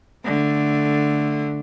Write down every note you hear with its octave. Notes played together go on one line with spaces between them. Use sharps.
D3 A3